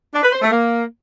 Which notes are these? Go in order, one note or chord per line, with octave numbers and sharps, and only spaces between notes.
D4
B4
C5
A3
A#3